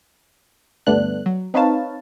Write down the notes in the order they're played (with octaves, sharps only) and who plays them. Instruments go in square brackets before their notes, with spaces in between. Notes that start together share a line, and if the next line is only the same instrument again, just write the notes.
[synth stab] D2 G2 A3 B3 D4 F#6
F#3
C4 D#4 B4 C#5 F5 A5